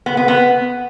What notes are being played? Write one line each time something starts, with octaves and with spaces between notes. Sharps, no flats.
B3
B3
B3